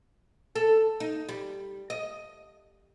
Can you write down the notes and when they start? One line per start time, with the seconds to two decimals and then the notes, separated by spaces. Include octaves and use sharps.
0.55 A4
1.00 D#4
1.29 G3
1.90 D#5